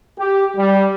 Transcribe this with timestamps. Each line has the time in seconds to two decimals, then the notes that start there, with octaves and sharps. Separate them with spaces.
0.19 G4
0.56 G3